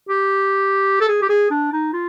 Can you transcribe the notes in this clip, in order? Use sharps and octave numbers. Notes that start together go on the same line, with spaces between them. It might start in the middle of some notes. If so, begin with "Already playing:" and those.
G4
A4
G#4
G4
G#4
D4
D#4
F4